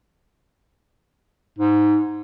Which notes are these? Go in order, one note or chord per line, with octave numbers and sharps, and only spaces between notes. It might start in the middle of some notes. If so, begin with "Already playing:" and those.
G#2